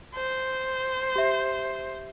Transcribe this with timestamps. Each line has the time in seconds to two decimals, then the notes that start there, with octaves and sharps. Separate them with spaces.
0.15 C5
1.16 G4 E5